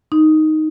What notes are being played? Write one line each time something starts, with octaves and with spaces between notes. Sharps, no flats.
D#4